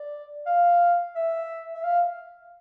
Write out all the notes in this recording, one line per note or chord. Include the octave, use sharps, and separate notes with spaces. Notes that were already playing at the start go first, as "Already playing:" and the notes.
Already playing: D5
F5
E5
E5
F5